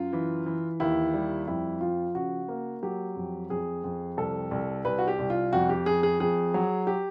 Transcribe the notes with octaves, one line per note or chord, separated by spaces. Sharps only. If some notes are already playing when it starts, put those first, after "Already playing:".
Already playing: F#2 F4
E3
E3
D#2 E4
G3
F2 E4
F3 F4
C#3 F#4
A#3
F#3 G4
F2
F2 G#4
F2
C2 A4
C2
C2 B4
F#4
G4
C2
F4
F2 F#4
G4
F2 G#4
G#4
F2 G#4
F#3
G4